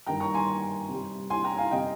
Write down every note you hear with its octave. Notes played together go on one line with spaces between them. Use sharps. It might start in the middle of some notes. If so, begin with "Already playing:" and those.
G2 D#3 G3 G5 A#5
A#5 C#6
G#5 C6
C3 G3
G#5 C6
G5 A#5
F5 G#5
C3 G3 D#5 G5